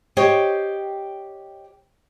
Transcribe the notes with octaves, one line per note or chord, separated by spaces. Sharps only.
G4 C5 C#5 D#5 G5